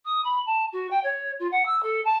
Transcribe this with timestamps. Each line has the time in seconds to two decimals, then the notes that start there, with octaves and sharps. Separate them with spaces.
0.05 D#6
0.24 B5
0.46 A5
0.72 F#4
0.90 G5
1.03 C#5
1.39 F4
1.51 F#5
1.65 E6
1.83 A4
2.05 A5